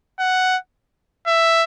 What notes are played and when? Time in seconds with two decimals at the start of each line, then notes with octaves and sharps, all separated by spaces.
0.19 F#5
1.27 E5